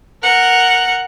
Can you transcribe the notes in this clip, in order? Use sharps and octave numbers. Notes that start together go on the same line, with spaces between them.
A#4 F#5